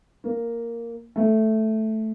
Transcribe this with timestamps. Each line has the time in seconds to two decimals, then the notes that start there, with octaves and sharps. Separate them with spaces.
0.24 A#3
1.16 A3